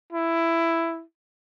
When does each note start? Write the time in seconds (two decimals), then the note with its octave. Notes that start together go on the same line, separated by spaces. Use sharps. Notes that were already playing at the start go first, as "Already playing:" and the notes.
0.13 E4